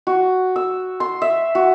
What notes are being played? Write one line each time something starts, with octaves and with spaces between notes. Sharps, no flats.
F#4
E6
C6
E5
F#4